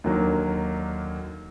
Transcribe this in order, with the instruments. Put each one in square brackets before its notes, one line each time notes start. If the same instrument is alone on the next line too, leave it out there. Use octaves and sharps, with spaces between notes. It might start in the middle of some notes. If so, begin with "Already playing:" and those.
[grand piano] D#2 D3 F#3 A#3